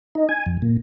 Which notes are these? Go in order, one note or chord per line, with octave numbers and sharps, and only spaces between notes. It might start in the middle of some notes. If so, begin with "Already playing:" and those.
D#4
G#5
F2
A#2